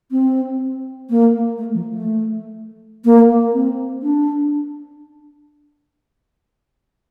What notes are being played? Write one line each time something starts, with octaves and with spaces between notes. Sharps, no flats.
C4
A#3
A3
F3
A3
A#3
C4
D4